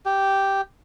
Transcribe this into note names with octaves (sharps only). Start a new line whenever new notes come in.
G4